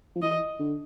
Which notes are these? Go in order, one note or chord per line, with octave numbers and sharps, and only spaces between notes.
F3
E3 D#5
D3